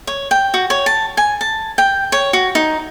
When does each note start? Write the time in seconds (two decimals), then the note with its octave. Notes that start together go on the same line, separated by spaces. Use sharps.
0.07 C#5
0.31 G5
0.54 F#4
0.70 C#5
0.86 A5
1.17 G#5
1.41 A5
1.78 G5
2.12 C#5
2.33 F#4
2.55 D#4